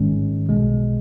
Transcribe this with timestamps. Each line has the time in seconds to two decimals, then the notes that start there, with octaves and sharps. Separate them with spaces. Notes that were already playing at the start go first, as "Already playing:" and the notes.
Already playing: G#1 G#2 D#3 G#3 C#4
0.49 B1 B2 G#3